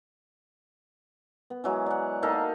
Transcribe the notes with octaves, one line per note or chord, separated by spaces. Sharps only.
B3
E3 F#3 G#3
D5 F#5
A#3 D#4 A4 F5